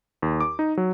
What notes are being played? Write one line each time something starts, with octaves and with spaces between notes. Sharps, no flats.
D#2
D6
D#4
F#3